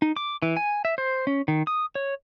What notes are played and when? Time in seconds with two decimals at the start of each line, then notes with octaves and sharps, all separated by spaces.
0.02 D#4
0.17 D6
0.42 E3
0.57 G#5
0.85 E5
0.98 C5
1.27 C#4
1.48 D#3
1.67 D#6
1.95 C#5